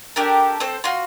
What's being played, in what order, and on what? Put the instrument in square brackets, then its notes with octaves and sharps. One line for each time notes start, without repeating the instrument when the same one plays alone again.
[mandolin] D4 G4 A4 A#4
C4 A4 C5
F4 F#4 C6